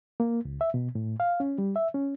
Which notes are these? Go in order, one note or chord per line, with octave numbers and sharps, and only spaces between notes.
A#3
C#2
E5
B2
A2
F5
C#4
G3
E5
C#4